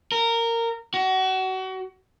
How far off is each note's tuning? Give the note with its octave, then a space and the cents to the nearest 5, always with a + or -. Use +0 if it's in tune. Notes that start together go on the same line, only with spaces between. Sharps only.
A#4 -15
F#4 +30